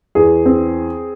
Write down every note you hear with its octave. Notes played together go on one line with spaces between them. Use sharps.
E2 G#4
C4